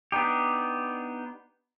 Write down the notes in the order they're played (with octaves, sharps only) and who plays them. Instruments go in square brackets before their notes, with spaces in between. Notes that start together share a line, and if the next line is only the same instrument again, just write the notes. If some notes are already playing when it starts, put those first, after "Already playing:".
[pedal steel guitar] B3 D4 D#4 G4